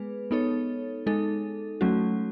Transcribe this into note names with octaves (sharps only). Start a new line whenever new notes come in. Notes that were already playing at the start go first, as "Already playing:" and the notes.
Already playing: G#3 B3 G#4 B4
B3 D#4 A4 C#5
G#3 D#4 A4
F#3 A3 C#4 F#4